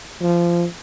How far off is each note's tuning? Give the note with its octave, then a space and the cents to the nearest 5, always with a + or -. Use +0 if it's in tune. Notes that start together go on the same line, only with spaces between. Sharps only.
F3 -20